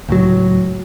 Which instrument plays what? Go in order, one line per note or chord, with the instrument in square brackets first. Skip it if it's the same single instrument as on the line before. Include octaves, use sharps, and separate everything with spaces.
[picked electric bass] C#2 A2 F#3